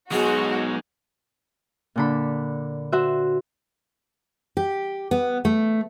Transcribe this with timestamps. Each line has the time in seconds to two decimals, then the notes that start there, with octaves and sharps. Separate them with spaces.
0.12 F#3 G#3 B3 D#4 F#4 G#4
1.96 A#2 D3 B5
2.92 F#4 C5 E5
4.57 G4
5.11 B3
5.45 A3